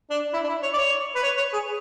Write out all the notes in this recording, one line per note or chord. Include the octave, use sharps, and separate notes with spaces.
D4
E4
D4
E4
C#5
D5
C#5
B4
C#5
C#5
G#4